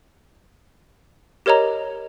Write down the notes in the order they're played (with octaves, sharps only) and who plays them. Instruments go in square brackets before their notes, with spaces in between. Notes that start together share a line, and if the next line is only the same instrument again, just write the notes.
[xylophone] G4 A#4 C#5 D#5 A#5